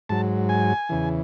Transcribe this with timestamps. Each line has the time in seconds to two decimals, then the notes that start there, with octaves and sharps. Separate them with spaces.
0.09 G#2 F#3 A5
0.49 G#5
0.89 E2 C#3 E3